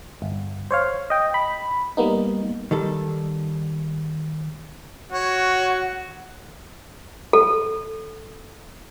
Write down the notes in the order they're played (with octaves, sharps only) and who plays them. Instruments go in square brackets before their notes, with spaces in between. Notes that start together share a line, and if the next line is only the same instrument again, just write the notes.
[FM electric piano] G1
C5 C#5 F5
D#5 G5
B5
G3 A#3 B3 D#4
[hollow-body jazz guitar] D#3 G3 A4
[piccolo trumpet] F#4 [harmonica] C#5 [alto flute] F#5
[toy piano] A4